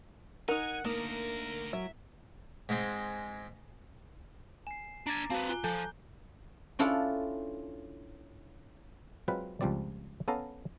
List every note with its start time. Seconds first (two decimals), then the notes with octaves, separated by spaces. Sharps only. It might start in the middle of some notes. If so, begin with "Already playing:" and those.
0.48 D#4 A#4 F#5 G#5
0.85 A3 A#3 D4 D#4 A#4
1.73 F#3 E5
2.69 G#2 G#3 C4 C6
4.67 G#5 C7 E7
5.07 D4 G#5 A#5 D6 A6 A#6 D7
5.30 C4 F#4 B4 F5 A5
5.49 F4 G#5 F#6 G7
5.64 F3 A4 G#5 A5 G6
6.79 C#4 D4 E4 F4 A4
9.28 F#3 G#3 C4 F4 B4
9.61 C#2 F3 G3 C4 D5
10.28 B3 C#4 A4 F5 A#5